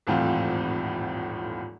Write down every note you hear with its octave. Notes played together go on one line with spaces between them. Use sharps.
D#1 G#1 A2 E3 C4 F4